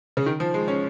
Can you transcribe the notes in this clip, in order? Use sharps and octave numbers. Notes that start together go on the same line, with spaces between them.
C#3
D#3
F3
G#3
C#4